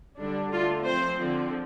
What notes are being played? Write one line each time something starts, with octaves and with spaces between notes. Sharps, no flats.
D3 G3 D4
D3 A3 D4 F4
F3 C4 C5
D3 F3 C4